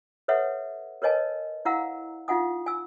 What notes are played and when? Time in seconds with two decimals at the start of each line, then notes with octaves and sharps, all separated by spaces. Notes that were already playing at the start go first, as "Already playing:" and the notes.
0.28 A4 B4 C#5 E5 F#5
1.02 A#4 B4 C#5 D#5 G#5 A5
1.65 E4 F5 F#5 A#5 E6
2.28 D#4 F4 F5 F#5 G#5 D#6
2.66 G#5 E6